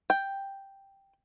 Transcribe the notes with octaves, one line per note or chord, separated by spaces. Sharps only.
G5